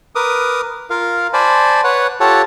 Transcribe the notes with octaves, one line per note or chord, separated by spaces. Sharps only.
A#4 B4 D6 D#6
F4 A#4 F5
C5 D5 G#5 A5 B5
B4 C#5 F#5
F4 G4 A4 C#5 F#5 A5